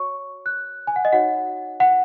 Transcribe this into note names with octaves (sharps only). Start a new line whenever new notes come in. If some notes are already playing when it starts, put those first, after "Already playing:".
Already playing: F#4 C#5 C#6
F#6
G#5
F#5
D#5
D#4 F#4 C#5 F#5
F#5